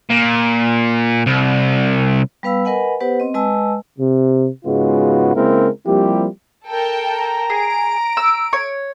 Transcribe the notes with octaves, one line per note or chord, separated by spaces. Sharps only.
A#2
C2
G3 B3 B4 F5 B5 E6
A#4 B4 D#5 F#5 G#5 B5
B3 G4 B4 C5 F#5
C4 D#5
G#3 B4 D#5 G#5 A5 E6
C3
G#2 C#3 G#3 B3 F4 F#4
C#3 G#3 A#3 C4 E4 A#4
F3 G3 A#3 C4 E4 G4
A4 A#4 G5
A#5
G#4 D7
E6
C#5